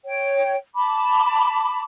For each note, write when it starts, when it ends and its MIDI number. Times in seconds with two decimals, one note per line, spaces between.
0.05 0.54 73
0.05 0.54 79
0.74 1.82 81
0.74 1.82 83
0.74 1.82 86